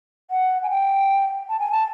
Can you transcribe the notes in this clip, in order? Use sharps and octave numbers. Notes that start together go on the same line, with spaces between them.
F#5
G#5
G5
A5
G#5
A5